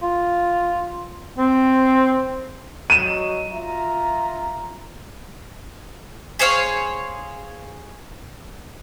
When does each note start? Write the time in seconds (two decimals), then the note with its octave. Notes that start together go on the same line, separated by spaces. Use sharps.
0.02 F4
1.38 C4
2.90 F#3 D#5 D#7 E7
3.51 F4 E5 A#5
6.39 G#4 C5 C#5 F5